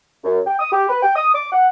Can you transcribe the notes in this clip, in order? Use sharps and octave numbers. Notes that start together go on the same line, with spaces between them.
F#2
G5
D#6
G4
B4
G5
D#6
D6
F#5